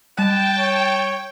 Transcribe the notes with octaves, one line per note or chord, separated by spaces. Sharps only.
G3 G5 A5 F#6
C#5